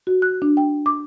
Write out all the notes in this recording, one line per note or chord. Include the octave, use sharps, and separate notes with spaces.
F#4
F#6
D4
G5
D6